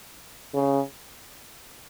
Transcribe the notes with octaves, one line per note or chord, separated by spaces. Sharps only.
C#3